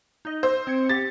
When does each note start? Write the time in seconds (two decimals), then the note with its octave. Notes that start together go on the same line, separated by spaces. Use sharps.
0.25 D#4 D#5
0.43 C5 E6
0.67 C4 G#6 C#7
0.89 G4 A6